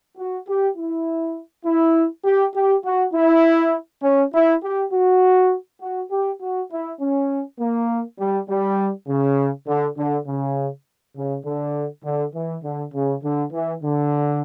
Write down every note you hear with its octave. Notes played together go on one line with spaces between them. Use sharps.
F#4
G4
E4
E4
G4
G4
F#4
E4
C#4
E4
G4
F#4
F#4
G4
F#4
E4
C#4
A#3
G3
G3
C#3
D3
D3
C#3
C#3
D3
D3
E3
D3
C#3
D3
E3
D3